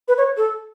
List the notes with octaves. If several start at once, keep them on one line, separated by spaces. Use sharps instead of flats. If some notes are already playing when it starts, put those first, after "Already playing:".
B4
C#5
A4